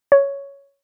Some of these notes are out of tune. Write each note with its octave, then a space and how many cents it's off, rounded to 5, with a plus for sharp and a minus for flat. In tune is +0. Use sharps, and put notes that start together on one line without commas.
C#5 +5